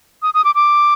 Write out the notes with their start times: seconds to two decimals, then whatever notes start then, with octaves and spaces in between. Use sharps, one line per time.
0.22 D#6
0.34 D#6
0.44 D6
0.55 D6